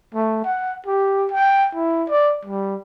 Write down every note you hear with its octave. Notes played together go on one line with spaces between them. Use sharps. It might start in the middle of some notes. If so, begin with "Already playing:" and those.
A3
F#5
G4
G5
E4
D5
G3